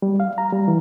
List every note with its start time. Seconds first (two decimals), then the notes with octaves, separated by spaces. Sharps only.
0.02 G3
0.20 F5
0.38 A#5
0.52 G3
0.68 E3